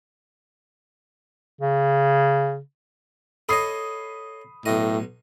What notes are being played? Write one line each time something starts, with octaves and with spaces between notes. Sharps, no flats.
C#3
A4 C#5 D#5 B5 D#6 C7
B1 A2 D#5